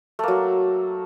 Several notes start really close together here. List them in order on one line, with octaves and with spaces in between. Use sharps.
A3 A#3 F#3